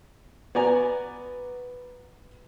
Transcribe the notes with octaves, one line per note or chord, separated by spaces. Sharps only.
B3 F#4 D5 G#5 A#5